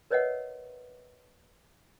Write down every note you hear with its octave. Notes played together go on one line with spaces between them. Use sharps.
A#4 B4 C#5 D#5 E5 F#5